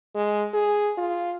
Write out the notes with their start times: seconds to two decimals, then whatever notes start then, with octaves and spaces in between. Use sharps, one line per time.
0.15 G#3
0.54 G#4
0.98 F4